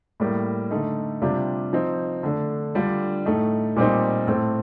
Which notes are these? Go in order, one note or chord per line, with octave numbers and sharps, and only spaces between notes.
A2 G3 A#3
D3 A3 D#4
C3 G3 D4 F4
F3 C4 D#4
D3 A3 D4
D3 G3 D4 F4
A2 A3 D#4
A#2 G3 C4 D#4
A2 A3 C4